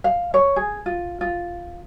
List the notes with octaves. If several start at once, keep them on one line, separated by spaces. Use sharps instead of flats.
F5
C#5
G#4
F4
F4